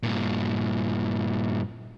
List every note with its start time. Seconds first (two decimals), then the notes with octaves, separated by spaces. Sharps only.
0.03 G2 A#2